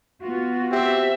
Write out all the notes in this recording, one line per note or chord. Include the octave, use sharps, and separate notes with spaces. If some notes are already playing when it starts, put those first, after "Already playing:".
B3 F4 F#4
C4 G4 E5